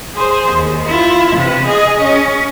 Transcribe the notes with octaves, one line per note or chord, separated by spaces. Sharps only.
G#4 C5
D#2
E4 F4
C3 B4
G#4 D#5
C#4